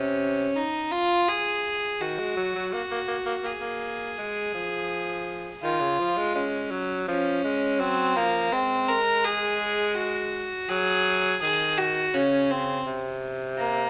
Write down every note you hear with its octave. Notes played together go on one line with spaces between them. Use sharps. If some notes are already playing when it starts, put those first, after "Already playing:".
Already playing: C3 C#4
D#4
F4
G#4
D#3 F#4
G#3
F#3
F#3
A#3 F#4
A#3
A#3
A#3
A#3 G#4
A#3
G#3
F3
D#3 F4
C#3
F3
G#3
G#3 C#4
F#3
F3 C#4
G#3
F#3 C4
F3 A#3
G#3 C4
A#4
G#4
F#4
F#3 G#4
D#3 G#4
F#4
C#3 C#4
C4
C3
A#3